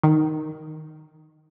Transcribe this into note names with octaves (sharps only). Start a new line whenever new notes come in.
D#3